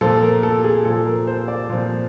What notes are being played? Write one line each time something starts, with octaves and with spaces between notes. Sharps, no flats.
A#2 F3 A4
A#4
A4
G#4
A#2 F3 A4
A#4
C5
D5
A#2 F3